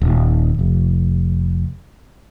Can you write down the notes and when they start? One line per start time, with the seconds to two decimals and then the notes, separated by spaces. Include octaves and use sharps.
0.02 D#1
0.59 F1